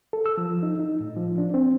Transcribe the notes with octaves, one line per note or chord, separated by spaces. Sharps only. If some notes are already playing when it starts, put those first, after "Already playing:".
A4
E6
F3
D#4
D#4
A2
F3
D4
C4